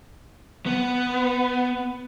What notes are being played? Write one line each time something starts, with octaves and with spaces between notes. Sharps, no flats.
B3